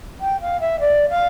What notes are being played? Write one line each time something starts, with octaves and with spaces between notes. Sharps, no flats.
G5
F5
E5
D5
F5